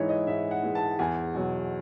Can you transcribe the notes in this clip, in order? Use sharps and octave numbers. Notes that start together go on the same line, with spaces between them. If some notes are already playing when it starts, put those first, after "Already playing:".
Already playing: G#2 E3 G#3 D#4 E4 C#5
D#5
G#2 E5
F#5
E3 G#3
A5
E2 G#5
B2 F#3